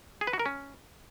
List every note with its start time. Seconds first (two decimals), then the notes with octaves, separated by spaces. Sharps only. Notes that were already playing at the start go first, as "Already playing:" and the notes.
0.21 G#4
0.27 B4
0.33 F#4
0.39 A#4
0.46 C#4